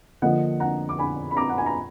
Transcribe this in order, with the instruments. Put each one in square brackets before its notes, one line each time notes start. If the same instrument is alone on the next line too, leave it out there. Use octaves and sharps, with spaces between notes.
[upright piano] D3 F3 A#3 D#5 F#5
F#5 A#5
D6
G#5 B5
B5
A#5 D6
F#5
G#5
A#5